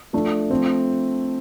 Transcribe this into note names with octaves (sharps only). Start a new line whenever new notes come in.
F3 A3 D4
F3 A3 C4